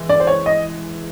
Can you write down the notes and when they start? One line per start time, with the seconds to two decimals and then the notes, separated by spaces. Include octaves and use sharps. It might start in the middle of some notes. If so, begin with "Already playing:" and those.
Already playing: E3 G#3
0.09 D5
0.20 C5
0.27 C#5
0.46 D#5